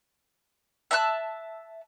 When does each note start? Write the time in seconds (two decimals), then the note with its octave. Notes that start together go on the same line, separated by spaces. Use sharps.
0.91 E5 A5 B5 F#6